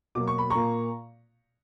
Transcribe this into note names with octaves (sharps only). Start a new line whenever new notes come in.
B2 F#3 A#3 D6
C#6
B5
A#2 A#3 A#5 C#6